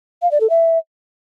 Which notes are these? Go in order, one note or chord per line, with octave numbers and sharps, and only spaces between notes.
F5
D5
A4
E5